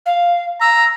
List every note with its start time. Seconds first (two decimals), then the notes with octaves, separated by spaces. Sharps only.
0.05 F5
0.61 A#5 E6